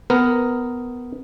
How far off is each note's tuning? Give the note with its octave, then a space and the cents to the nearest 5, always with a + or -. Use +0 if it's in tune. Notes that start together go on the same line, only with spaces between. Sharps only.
B3 +10 A#4 +0